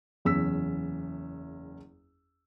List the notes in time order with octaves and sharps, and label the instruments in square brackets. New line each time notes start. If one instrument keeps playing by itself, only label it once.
[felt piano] F#1 E2 C#4 E6 B6